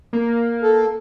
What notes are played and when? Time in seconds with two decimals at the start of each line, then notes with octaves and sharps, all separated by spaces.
0.13 A#3
0.62 A4